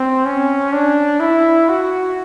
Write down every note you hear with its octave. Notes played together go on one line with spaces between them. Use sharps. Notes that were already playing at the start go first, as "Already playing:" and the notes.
Already playing: C4
C#4
D4
E4
F#4